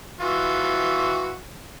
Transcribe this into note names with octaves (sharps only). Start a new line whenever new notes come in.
E3 F4 F#4